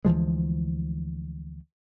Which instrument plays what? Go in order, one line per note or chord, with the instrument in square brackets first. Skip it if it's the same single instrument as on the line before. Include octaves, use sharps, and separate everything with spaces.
[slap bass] D2 E3 F3 G#3